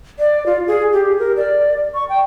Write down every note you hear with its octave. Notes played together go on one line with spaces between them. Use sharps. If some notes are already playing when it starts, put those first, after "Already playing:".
D5
F4
G#4
G4
A#4
D5
C#6
G5